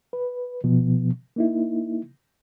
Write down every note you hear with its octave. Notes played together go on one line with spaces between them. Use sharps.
B4
B2 F3 B3
A#3 D#4 E4